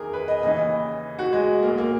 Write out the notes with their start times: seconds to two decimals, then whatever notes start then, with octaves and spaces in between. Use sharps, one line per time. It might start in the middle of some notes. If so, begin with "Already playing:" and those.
Already playing: F#1 E2 D#3 G#4 A#4
0.13 B4
0.28 D#5
0.42 D#2 C#3 E3 D#5
1.19 F#4
1.33 G#3
1.63 B1 A#2 A#3
1.78 A#3